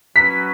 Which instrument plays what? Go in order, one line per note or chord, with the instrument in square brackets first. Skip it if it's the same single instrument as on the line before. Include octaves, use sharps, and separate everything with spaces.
[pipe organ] F#3 C#4 F#4 B4 [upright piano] B6